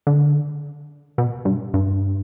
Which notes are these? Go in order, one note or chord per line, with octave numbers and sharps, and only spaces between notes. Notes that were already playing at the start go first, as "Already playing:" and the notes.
D3
B2
G2
G2